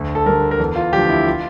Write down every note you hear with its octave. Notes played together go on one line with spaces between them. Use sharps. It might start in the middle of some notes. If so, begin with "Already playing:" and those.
Already playing: D2
A4
D3 G3 A#4
A#4
E2 A4
F4
D3 F3 A3 G4
E4
F4